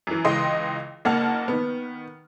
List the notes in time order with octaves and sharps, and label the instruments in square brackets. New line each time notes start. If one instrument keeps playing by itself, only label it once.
[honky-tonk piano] F#2 E3
C#2 E3 D#5 G5 C6
F#1 A#3 F#5 A5 F6
D#3 B3